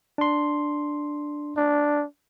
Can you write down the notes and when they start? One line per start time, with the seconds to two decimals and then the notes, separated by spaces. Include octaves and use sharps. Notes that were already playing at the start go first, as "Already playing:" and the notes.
0.18 D4 C6
1.57 D4